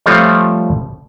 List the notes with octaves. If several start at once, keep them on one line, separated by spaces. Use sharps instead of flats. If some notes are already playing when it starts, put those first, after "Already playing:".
F3 G3 A3 C4 F4 C#5